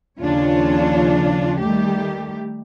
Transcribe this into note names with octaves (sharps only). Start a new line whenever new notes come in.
D#2 C#3 F3 D4 F4 C#5
D#3 G3 A3 G4